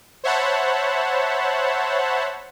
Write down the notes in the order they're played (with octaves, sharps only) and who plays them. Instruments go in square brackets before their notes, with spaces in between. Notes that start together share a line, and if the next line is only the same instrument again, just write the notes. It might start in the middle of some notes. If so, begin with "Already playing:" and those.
[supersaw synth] C5 C#5 E5 F#5 A5 B5